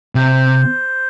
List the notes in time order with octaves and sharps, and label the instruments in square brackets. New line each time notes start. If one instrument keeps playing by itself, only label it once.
[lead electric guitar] C3 [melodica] C5